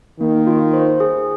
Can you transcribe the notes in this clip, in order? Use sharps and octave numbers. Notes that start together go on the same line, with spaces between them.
D#3 A#3
F4
C5
G#4